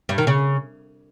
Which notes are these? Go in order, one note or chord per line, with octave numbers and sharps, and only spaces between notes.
G2
D#3
C#3